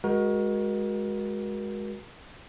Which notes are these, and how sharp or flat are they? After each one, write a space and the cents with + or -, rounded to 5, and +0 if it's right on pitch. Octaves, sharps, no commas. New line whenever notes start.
G#3 +0 F#4 +0 A#4 +35